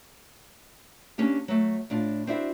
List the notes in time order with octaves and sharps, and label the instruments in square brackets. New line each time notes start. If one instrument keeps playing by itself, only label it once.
[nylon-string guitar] A#3 C#4 D4 G4
F#3 A3
A2 D4 F4
C4 D4 E4 F#4